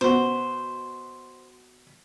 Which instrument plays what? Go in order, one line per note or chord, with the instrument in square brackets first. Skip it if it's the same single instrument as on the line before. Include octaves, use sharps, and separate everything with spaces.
[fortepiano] B2 F#4 [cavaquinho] C5